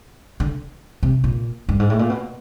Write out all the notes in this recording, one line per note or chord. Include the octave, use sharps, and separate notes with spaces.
D3
C3
A#2
G2
G#2
A2
A#2
B2